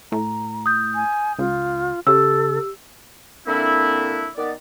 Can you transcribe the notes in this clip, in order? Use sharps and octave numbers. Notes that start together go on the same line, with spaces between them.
A2 A#5
D#6 G6
G#5
C#2 F4
C#3 G4 A4 E6
D3 A#3 C4 D4 E4
D#3 B3 D5